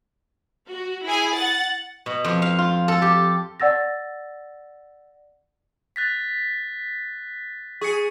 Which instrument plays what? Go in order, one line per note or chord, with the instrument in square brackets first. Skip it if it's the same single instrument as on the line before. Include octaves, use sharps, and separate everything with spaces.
[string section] F#4
E4 G#4 G#5
F#5 A6
[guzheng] B2
F2
F5
F4
A4
G4
[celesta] D5 F#5 E6 A6 A#6
[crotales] F#6 A6 B6
[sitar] G#4 [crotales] C#6 C#7